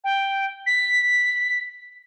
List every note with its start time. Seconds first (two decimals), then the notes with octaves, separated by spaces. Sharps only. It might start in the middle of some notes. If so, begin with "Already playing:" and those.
0.04 G5
0.67 B6